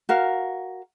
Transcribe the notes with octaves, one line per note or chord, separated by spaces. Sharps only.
F#4 A#4 F5